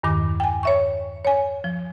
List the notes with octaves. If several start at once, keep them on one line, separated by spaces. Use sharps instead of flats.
E2 G2 D#3 D6
G5 G#5
C#5 E5 C#6
C#5 G#5
F3